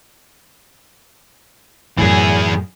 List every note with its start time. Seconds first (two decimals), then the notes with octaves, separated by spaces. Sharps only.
1.98 F#2 A2 E3 G#4